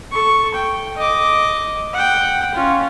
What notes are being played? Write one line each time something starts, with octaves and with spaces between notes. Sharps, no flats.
A4 C#6
G5
D#5 D6
F#5 G5
C#4 F4